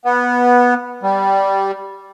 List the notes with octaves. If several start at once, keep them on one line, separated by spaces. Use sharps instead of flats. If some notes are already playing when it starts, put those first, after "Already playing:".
B3
G3